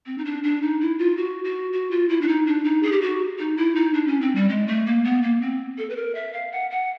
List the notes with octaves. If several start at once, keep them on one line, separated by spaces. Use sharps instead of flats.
C4
D#4
D4
D4
D#4
E4
F4
F#4
F#4
F#4
F4
E4
D4
D#4
D4
D#4
G#4
G4
F#4
D#4
E4
D#4
D4
C#4
C4
G3
G#3
A3
A#3
B3
A#3
C4
A4
B4
A#4
E5
F5
F#5
F#5